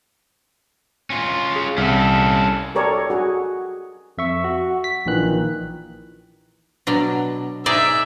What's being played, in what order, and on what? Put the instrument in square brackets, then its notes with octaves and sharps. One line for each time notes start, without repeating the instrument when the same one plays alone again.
[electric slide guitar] C#4 F4
[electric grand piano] G#4
[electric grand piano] C2 [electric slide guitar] C#4 A4
[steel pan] G4 A4 A#4 C#5 D5
F#4 G#4
[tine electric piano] F2 E5 C#6
F#4
B6
A#1 A#2 D#3 E3 F#6
[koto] B2 F#3 D4
[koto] D#4 G#4 D5 [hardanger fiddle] E5